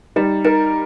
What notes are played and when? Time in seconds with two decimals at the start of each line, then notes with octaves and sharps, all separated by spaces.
0.16 G3 D#4
0.45 D#4 A#4